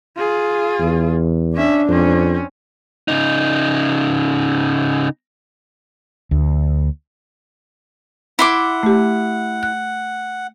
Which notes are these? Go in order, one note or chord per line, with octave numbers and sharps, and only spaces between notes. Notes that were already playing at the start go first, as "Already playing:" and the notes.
F4 G#4
E2
C#4 D4 E5
F2 C4 C#4
C#3 D#4
D2
E4 F#5 C6 D6
A3 G4
F#6